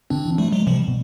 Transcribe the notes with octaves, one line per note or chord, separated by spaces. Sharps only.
D3 C4 D4
E3
F3 G3 A3
F#3 G#3
C3 F3 G3
B2